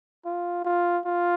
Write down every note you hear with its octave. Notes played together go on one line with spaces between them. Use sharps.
F4
F4
F4